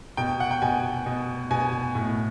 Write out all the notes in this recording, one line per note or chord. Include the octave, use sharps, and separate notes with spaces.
B2 G5
F#5
G5
B2 G#5
B2
B2 G#5
A2